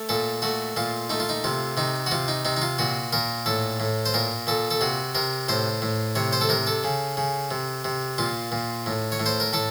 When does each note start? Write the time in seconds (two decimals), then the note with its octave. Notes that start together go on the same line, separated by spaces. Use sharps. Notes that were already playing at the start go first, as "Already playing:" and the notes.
Already playing: A3
0.09 A#2 A4
0.42 A3 F#4
0.76 A#2 F4
1.10 A3 D#4
1.20 F4
1.29 D#4
1.44 C3 F4
1.77 C3 D#4
2.06 F#4
2.11 C3 F4
2.28 D#4
2.45 C3 D#4
2.57 D#4
2.62 F4
2.79 A#2 F#4
3.13 A#2 A#4
3.46 A2 A4
3.80 A2
4.06 C5
4.14 A#2 A#4
4.47 A#2 A4
4.71 A4
4.81 C3 F#4
5.15 C3 A#4
5.49 A2 C5
5.82 A2
6.15 C3 C#5
6.33 C5
6.41 A4
6.49 C3 A#4
6.67 A4
6.84 C#3
7.17 C#3
7.51 C3
7.84 C3
8.18 A#2 F4
8.52 A#2
8.86 A2
9.12 C#5
9.20 A2
9.26 C5
9.40 A#4
9.53 A2 A4